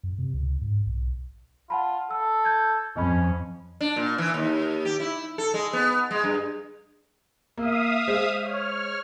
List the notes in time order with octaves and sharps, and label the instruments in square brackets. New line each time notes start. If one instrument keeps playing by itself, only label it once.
[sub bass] F#2
C3
C#2
G#2
B1
[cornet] F4 [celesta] F#5 A5 B5
[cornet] A4 [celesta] E6
[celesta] G6 G#6
[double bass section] F2 [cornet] C#4 [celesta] D#5 B5
[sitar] D4
A#2
E3
D#2
G4
E4
A4
G#3
B3
G#3
G2
[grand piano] A#3 [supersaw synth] E5 F5 D#6
[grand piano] G#3 C5
[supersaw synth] C#5 F6